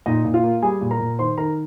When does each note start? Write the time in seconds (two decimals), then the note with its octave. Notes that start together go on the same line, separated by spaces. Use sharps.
0.06 A#2 D#4 D#5
0.25 A#2
0.34 F4 F5
0.44 A#3
0.62 G3 G#4 G#5
0.81 A#2
0.91 A#4 A#5
1.00 A#2
1.19 D#3 C5 C6
1.38 D#3 A#4 A#5